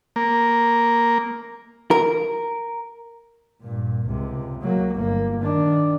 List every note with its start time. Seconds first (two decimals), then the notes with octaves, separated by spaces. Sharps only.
0.16 A#3
1.91 A#4
3.61 G2 A#2
4.05 C#2 C3
4.62 F#3 A#3
4.95 G1 A#3
5.40 D#3 D4